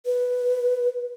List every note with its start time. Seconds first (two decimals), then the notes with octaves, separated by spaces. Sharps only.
0.06 B4